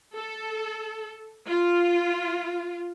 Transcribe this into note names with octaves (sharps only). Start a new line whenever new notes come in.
A4
F4